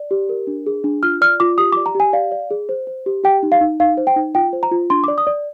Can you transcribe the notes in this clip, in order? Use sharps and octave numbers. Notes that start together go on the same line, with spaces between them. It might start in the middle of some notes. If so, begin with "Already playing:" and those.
Already playing: D5
G4
A#4
D4
G#4
D4
F4 F6
D5 F6
F4 D6
G4 D#6
D6
D5
A#5
G4 G#5
D5 F5
D5
G#4
C5
C5
G4
G4 G5
D#4
F5
D#4
D#4 F5
C5
G5
D#4
F4 G5
C5
A#5
F4
D4 C6
D6
D5
D#6
D5